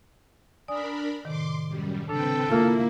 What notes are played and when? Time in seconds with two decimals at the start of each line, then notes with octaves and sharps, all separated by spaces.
0.68 D4 A#4 D5 G#5 B5 D#6
1.25 A2 C3 D#3 C6 D6
1.68 F#2 G3
2.09 C#3 C4 D4 A4 B4 G5
2.50 A#3 E4 F4 E5 F5